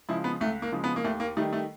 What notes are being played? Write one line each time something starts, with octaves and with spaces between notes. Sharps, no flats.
C#3 F3 G#3 E4
B3
C#2 A3
A#3
C#3 F3 G#3
B3
A#3
D#2 A3
A#3
D#3 G3 A3
A3